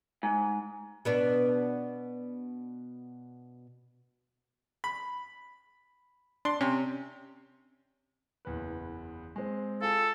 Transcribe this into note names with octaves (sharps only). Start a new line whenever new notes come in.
G#2
B2 B3 D4
B5
D4 C6
C3 C#4
F#1 E2 B4
G#3 C4
F4 G#4 A4